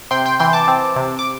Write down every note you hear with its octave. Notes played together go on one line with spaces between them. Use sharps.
C3 G5 C6
G5 C6
E3 G5 C6
A5 D6
C4
C3
D6